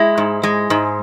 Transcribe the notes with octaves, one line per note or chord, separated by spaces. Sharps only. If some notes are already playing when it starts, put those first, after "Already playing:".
Already playing: G#3 E4
G#2
G#3
G#2